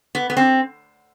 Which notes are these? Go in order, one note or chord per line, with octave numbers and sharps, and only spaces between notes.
B3
B3
C4